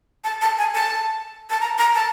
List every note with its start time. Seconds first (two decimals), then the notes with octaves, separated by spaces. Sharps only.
0.24 A5
0.41 A5
0.58 G#5
0.75 A5
1.50 A5
1.61 A#5
1.78 A#5
1.95 A5